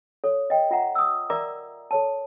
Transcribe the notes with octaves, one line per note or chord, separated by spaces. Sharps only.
A4 C#5
D#5 G5
F4 E5 F#5 A#5
D#6 E6
A#4 D5 E5 A#5 D6
A4 C#5 A5